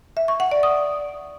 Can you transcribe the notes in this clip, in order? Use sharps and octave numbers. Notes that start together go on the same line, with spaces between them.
E5
C#6
F#5
D5
D#6